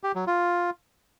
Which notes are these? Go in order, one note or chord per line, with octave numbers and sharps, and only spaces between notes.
G4
F#3
F4